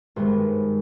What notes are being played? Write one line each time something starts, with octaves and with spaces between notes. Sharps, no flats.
G#1 G2 D#3 G#3 B3 C5